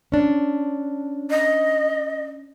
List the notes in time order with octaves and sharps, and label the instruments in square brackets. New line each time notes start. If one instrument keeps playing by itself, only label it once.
[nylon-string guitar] C#4 D4
[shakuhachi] D#5